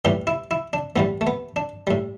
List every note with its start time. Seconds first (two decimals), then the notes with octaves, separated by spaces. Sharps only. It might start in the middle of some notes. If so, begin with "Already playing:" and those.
0.05 A2 E3 G3 G4
0.27 E4
0.51 E4
0.73 D4
0.96 A2 E3 G3 B3
1.21 A3
1.27 B3
1.56 D4
1.87 A2 G3